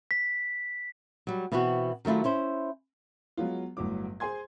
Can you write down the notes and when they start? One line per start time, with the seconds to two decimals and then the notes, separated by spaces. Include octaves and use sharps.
0.11 B6
1.27 F#3 G3
1.52 B2 E3 B3 C4 F#4
2.05 D#3 F#3 A3 E4 F4
2.24 C#4 E4 C5
3.37 F#3 G#3 B3 F4
3.77 G1 A2 F#3 D6
4.20 G#4 C5 G#5 C6 G#6